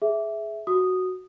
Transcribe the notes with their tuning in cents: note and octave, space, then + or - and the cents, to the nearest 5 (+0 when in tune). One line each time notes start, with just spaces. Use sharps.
G#4 +15 E5 +0
F#4 +0 D#6 -10